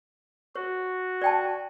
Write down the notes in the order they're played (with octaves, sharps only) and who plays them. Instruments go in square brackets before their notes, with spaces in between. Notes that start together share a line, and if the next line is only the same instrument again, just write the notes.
[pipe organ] F#4 [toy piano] C#5
[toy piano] D5 G5 A5